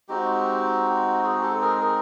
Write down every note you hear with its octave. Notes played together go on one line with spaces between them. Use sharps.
G#3 C4 D#4 F#4 G4
F#4 G#4
G4 A4
G#4 A#4
G#4 A#4